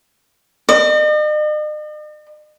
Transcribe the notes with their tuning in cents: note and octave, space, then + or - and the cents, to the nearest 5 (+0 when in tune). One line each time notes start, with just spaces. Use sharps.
D#5 -45